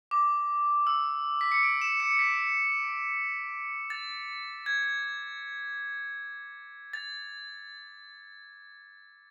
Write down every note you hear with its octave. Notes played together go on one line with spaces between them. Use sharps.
D6
E6
B6
C#7
D7
E7
C#7
C#7
B6
A6
G#6
A6